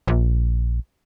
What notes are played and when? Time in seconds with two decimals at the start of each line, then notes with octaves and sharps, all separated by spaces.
0.08 A#1